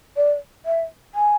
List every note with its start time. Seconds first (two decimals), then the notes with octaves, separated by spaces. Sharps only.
0.17 D5
0.66 E5
1.15 G#5